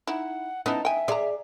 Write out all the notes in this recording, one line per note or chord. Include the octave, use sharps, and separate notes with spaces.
D#4 E4 F#5
B3 C#4 D#4 E4 A5
E5 G5 G#5
C4 G#4 D5 A#5